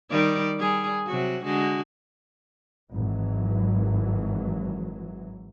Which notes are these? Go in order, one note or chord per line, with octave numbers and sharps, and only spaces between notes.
D#3 G3 D5
G3 G#4
C3 F#3 F#4
D3 G#3 F#4
G#1 E3 F#3